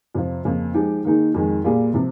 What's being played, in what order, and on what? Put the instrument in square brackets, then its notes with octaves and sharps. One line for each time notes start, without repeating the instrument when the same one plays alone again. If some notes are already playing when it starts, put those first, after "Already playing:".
[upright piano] F2 C3 F3 C4 F4
F2 C#3 F3 A#3
F3 G#3 D#4 G4
D#3 A#3 D#4 G#4
F2 D#3 G#3
A#2 G3 A#3 F4 G#4
C3 F3